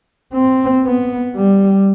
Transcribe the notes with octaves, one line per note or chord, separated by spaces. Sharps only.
C4
B3
G3